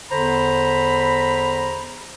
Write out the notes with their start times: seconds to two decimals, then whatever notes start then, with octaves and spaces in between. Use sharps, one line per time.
0.11 E2 D3 C5 A#5 B5